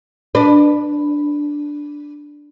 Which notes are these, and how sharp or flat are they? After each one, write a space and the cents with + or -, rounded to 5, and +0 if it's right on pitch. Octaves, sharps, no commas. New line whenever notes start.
D4 +0 B4 +0 D5 +35